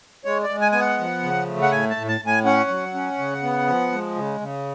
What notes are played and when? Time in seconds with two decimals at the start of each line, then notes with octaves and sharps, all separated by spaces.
0.25 G#3 C#5
0.44 D5
0.49 G#3
0.61 G#5
0.72 B3 G#5
0.80 F#5
0.99 F3
1.23 C#3
1.47 A3
1.62 F#5
1.72 A2 G#5
1.90 A5
1.96 A2
2.08 A5
2.21 A2
2.27 G#5
2.45 C#4 F#5
2.69 F#3
2.94 C#4
3.18 C#3
3.43 B3
3.67 F3
3.92 G#3
4.16 C#3
4.40 C#3